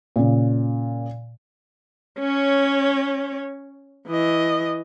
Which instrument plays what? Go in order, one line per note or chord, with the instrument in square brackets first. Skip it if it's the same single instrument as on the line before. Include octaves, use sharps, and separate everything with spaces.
[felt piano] A#2 C#3
[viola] C#4 C#5
E3 D#5